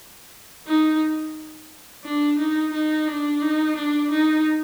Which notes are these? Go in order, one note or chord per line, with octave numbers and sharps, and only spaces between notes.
D#4
D4
D#4
D#4
D4
D#4
D4
D#4